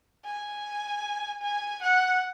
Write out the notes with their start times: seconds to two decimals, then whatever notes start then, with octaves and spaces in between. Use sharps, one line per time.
0.25 G#5
1.42 G#5
1.82 F#5